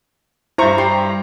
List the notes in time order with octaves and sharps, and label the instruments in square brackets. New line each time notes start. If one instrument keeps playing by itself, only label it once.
[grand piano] G2 A#5 [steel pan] E4 C5 C#6
[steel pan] G4 C6